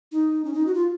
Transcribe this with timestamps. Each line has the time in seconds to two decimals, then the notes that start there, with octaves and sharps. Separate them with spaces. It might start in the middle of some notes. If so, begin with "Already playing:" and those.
0.12 D#4
0.45 C#4
0.54 D#4
0.66 F#4
0.74 F4